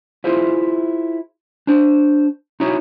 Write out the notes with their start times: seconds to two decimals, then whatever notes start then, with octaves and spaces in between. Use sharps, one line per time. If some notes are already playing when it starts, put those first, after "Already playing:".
0.24 E4 F4 G#4 C5 E5
1.67 D4 C5
2.60 D#4 E4 F#4 C#5